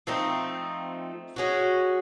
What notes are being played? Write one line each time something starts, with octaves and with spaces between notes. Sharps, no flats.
F3 A3 C4 D#4
G#3 C#4 F#4